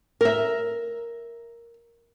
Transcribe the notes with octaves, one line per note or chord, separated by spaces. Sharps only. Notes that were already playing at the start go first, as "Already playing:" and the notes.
A#4 E5